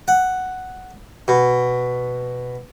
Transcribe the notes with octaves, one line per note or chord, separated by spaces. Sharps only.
F#5
B2